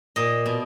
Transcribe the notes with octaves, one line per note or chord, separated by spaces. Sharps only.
A#2 D#5
B2